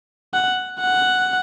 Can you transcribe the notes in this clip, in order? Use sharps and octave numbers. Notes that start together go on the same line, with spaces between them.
F#5
F#5